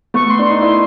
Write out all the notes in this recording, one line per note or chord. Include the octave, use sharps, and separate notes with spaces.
A3 B3 C#6
C6
D4
D#4 C6
D4 E4